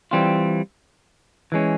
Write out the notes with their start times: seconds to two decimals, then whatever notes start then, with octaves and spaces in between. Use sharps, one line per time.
0.11 E3 G3 C4 F4
1.52 E3 G#3 C#4